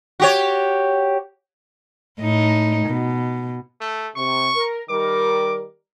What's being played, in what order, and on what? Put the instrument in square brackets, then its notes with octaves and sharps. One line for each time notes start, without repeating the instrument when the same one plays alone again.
[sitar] F#4 G4 C#5
[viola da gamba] A2 D#4
B2
[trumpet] A3
[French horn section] C3 [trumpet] C#6
[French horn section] A#4
[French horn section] D#3 G3 A#4 [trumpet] D6